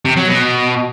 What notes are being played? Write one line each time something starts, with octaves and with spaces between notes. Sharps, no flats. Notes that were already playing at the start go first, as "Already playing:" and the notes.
C3
F#3
B2